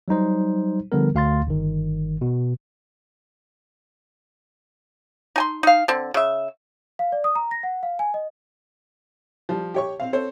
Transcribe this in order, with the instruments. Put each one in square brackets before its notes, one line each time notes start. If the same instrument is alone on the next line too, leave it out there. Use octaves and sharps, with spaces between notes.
[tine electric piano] F#3 G3 D#4 C5
D3 F3 G3 B3 A#4
D2 F5 C6 A6
G1 D#3
B2
[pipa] D#4 G#5 C6
D#4 F5
D3 C4
C#3 E5
[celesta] F5
D5
D#6
A#5
A#6
F#5
F5
G#5
D#5
[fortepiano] F3 G3
G4 C#5 C#6
C4 F5
C4 A4 C5 C#5